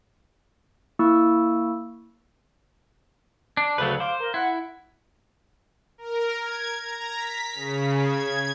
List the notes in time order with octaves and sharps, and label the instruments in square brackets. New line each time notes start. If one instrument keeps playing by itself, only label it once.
[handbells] A#3 E4 C#6 E6
[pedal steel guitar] D4
[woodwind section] D2 C#3 [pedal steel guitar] F#3 A3 B4
[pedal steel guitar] C5 [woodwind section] F5 D6
[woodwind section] A#4
[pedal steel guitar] E4 [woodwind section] F#5
[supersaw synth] A#4
G#6
A#5
B6
C#3
G#6